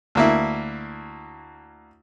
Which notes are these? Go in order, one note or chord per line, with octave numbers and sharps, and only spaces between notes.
D2 A#3 E4